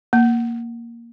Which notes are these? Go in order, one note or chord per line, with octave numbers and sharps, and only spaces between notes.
A#3